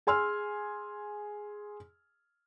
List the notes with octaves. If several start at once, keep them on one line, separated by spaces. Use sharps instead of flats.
G#4 G#5 C6 E6 F6